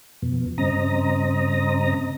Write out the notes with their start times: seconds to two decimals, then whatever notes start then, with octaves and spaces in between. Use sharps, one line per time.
0.22 F2 B2
0.58 G2 C#3 C4 D#5 A#5